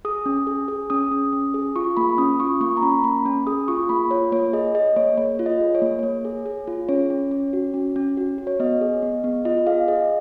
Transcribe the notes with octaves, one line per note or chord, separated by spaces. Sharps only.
G#4 D#6
C#4
G#4
G#4
C#4 D#6
C#4
C#4
G#4
F4 C#6
A#3 B5
C#4 D#6
F4 C#6
A#3 C#6
A#5
C#4 B5
A#3 B5
C#4
G#4 D#6
F4 C#6
A#3 B5
F4 C#5
A#3 C#5
G#4 D#5
G#4 D#5
A#3 C#5
A#3 C#5
F4
D#5
G#4
C#5
A#3
A#3 C#5
G#4
G#4
F4
C#4 C#5
C#4
C#4
F#4
C#4
C#4
F#4
F#4
C#5
B3 D#5
G#4
B3
B3
F4 D#5
G#4 F5
G#4 D#5